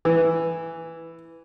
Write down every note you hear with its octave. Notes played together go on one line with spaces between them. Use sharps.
E3